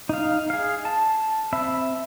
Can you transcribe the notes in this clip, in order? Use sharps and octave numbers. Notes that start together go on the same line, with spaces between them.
D#4 F5
G#4 F5
A5
C4 E5 B5